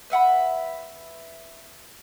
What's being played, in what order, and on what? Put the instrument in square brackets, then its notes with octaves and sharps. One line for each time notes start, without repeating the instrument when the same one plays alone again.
[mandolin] B4 E5 F#5 B5